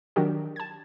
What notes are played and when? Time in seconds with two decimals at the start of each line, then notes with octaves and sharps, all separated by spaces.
0.16 D#3 F#3 D4 F#4 G4 A#4
0.56 A5 G#6